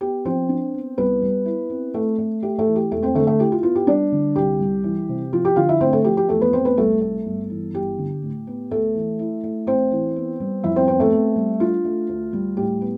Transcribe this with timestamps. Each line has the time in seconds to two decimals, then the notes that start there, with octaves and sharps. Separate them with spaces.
0.01 B3 G4
0.25 F3 C4 C5
0.49 D4
0.74 B3
0.98 C2 B3 B4
1.22 G3
1.46 E4
1.70 C4
1.94 A3 C4 A4
2.18 A3
2.43 A3 G4
2.58 A3 A4
2.67 E3
2.76 G4
2.91 E1 A3 A4
3.03 C4 C5
3.15 D3 A3 A4
3.27 A3 A4
3.39 E4 G4
3.52 F4
3.63 B3 F4
3.75 G4
3.87 G3 D4 D5
4.12 D3
4.36 C2 G4
4.59 G3
4.84 E3
5.09 C3
5.33 F3 F4
5.45 G4
5.56 D3 F4 F5
5.69 E4 E5
5.80 A3 C4 C5
5.93 A3 A4
6.04 F3 G4
6.17 G4
6.29 E2 A3 A4
6.41 B3 B4
6.53 A3 C4 C5
6.65 B3 B4
6.77 C2 A3 A4
7.01 A3
7.26 G1
7.50 E3
7.73 G1 G4
7.98 D3
8.22 A2
8.47 B3
8.71 D2 A3 A4
8.95 E3
9.19 E4
9.44 A3
9.67 A1 C4 C5
9.91 E3
10.16 B3
10.40 G3
10.64 F2 E4 E5
10.76 C4 C5
10.87 B3 C4 C5
11.00 A3 A4
11.12 C4
11.36 G3
11.60 D4 F4
11.85 A3
12.09 D2
12.33 G3
12.57 A2 G4
12.81 B3